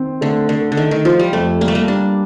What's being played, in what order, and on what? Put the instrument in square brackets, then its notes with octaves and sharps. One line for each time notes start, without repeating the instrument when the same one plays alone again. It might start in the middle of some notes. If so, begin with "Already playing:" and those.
Already playing: [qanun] D#3 [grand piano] C4
[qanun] D3 [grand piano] A3
[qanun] D3 [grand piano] A3
[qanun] D3
[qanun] D#3 [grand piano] A3
[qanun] D#3
[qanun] F3 [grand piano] F4
[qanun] G3
[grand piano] F2 [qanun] A3
[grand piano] G3 [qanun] A#3
[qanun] A3
A#3
[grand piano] G3 [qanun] D4